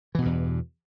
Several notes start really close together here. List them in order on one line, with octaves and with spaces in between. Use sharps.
E3 B2 G2 E2